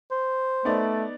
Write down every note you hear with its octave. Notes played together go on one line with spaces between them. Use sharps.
C5
A3 B3 D#4 D5